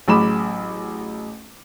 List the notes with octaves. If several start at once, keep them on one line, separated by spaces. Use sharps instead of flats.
A1 F#3 G#4 B5 D6 E7